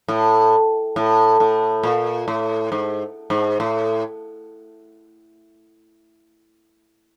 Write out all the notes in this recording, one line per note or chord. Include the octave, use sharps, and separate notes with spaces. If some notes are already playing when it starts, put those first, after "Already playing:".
A2
A2
A2
A#2
A2
G#2
G#2
A2